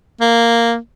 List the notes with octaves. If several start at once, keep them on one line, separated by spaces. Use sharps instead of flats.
A#3